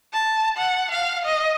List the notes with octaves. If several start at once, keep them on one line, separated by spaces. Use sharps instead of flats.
A5
F#5
F5
D#5